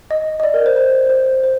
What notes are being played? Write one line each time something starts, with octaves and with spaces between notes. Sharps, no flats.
D#5
D#5
D5
A#4
C5
C5
C5
C5